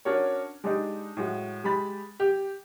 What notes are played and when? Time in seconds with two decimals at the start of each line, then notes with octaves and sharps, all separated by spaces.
0.05 C#4 D4 F#4 A#4 C#5
0.64 G#3 D4 D#4 G4
1.17 A2 G#3 F#4
1.64 G#3 G4 B5 A6
2.20 G4